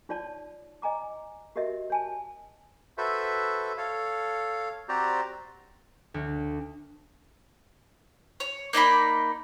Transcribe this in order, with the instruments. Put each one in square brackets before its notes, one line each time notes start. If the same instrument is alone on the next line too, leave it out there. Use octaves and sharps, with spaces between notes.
[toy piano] D#4 F4 C#5 D5 A5
D#5 G#5 A#5 D6
F#4 G4 A#4 D#5 E5
C#5 G#5 A5
[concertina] F#4 A4 B4 C5 E5
A4 C#5 F5
C4 F#4 G4 C5 D5 A#5
[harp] D2
[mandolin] C#5
A#3 D#4 D5 B5